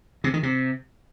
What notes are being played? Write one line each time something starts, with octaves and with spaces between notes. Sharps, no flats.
C3
D#3
C3